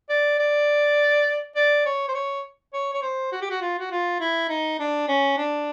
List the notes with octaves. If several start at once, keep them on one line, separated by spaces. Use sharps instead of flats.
D5
D5
D5
C#5
C5
C#5
C#5
C#5
C5
F#4
G4
F#4
F4
F#4
F4
E4
D#4
D4
C#4
D4